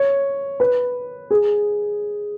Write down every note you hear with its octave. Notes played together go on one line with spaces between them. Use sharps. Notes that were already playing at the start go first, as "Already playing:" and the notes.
Already playing: C#5
B4
G#4